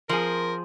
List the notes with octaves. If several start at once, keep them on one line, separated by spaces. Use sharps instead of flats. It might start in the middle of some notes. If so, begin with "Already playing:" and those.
F3 C4 G#4 A#4